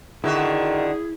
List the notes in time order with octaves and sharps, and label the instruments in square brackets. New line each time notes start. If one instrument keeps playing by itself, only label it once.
[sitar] D3 F#4 E5 [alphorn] D#3 [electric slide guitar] E4 [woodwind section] G#4